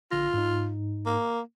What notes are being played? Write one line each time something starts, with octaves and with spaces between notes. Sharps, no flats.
A#1 D3 F4 A#6
G#2 D#4
A#3